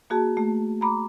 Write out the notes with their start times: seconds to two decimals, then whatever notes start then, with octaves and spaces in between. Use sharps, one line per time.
0.10 A#3 F#4 G#4 A5
0.37 A3
0.81 A#5 B5 D6